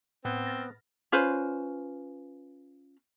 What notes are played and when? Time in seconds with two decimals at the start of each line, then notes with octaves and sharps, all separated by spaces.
0.25 A2 B3 C4 F#6 G#6
0.46 F6 A6 A#6
1.12 C#4 F4 B4 C5